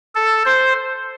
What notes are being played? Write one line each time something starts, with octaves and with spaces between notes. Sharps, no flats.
A4
C5